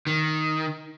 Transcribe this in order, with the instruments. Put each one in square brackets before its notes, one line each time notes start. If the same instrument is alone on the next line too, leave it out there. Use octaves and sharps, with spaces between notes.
[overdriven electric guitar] D#3